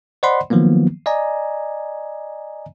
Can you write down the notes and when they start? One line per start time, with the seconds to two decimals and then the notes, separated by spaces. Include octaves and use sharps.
0.23 C5 D5 D#5 F#5 B5 C6
0.50 D#3 F3 F#3 A#3 B3
1.06 D5 D#5 G#5 A#5